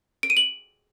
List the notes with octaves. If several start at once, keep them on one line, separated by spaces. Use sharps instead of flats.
D7
D#7
F#7